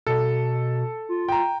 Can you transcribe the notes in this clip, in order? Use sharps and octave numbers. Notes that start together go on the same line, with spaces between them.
B2 A4
F4
G5 A#5